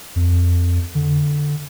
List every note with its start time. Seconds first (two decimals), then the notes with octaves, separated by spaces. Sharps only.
0.16 F2
0.95 D3